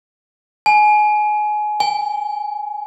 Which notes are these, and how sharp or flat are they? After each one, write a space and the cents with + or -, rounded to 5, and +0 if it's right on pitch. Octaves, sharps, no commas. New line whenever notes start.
G#5 +25
G#5 -30